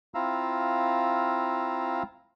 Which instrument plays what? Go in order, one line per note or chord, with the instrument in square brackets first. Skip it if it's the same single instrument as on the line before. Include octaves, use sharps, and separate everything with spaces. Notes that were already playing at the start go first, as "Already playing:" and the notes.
[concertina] C4 E4 F4 F5 A#5 E6